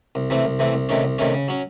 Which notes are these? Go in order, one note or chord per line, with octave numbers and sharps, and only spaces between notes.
C2
C3 E3 A3 C4
C2
C3 E3 A3 C4
C2
C3 D#3 A3 C#4
C2
C3 D#3 A3 C#4
C#3
F#3 C#4